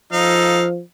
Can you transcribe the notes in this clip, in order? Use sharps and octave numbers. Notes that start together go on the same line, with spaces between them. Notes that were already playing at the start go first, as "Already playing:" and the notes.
F3 D#4 A4 F5